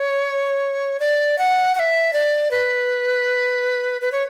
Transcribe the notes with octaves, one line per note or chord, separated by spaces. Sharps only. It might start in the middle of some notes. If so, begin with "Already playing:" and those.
Already playing: C#5
D5
F#5
F#5
E5
D5
B4
B4
C#5